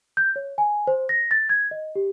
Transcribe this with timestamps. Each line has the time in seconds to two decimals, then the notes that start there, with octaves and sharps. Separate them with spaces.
0.17 G6
0.36 C#5
0.58 G#5
0.87 C5
1.09 A#6
1.31 A6
1.49 G#6
1.71 D#5
1.96 G4